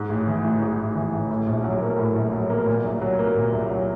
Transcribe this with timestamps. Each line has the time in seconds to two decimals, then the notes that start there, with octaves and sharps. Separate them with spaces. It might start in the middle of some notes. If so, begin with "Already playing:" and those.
Already playing: G#2
0.09 A1
0.27 E3
0.44 A1
0.62 G#2
0.78 A1
0.95 E3
1.13 A1
1.30 A2
1.47 A#1
1.64 F#3
1.81 A#3
1.99 A2
2.16 A#1
2.32 F#3
2.50 A#3
2.67 A#2
2.85 C2
3.01 F#3
3.19 A#3
3.36 A#2
3.53 C2
3.70 F#3